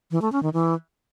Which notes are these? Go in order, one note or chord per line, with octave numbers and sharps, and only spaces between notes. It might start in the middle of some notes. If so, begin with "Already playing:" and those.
E3
A3
C#4
D#3
E3